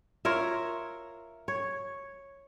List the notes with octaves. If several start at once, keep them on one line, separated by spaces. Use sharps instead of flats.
F4 A#4 C#5 E5
C#5